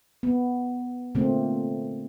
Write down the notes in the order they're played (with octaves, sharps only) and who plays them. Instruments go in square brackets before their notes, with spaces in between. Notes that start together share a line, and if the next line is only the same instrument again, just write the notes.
[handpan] B3
A#2 D3 A3 A#3 C4